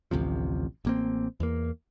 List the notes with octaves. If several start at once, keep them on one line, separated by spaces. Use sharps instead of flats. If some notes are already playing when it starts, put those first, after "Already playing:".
A1 D2 C3 F3
A1 A#3 C4
E2 A#3